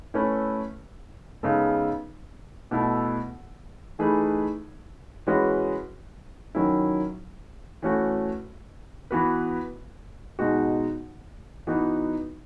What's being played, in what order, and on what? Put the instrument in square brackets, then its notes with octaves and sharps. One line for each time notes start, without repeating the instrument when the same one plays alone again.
[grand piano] A3 C#4 E4 B4
C#3 G#3 B3 D#4 A4
B2 A3 E4 A4
E3 A3 D#4 G#4 B4
E3 G#3 C#4 F#4 B4
D#3 F#3 C#4 E4
E3 A3 C#4 F#4
E3 B3 F#4 B4
B2 G#3 D#4 F#4
E3 B3 D#4 F#4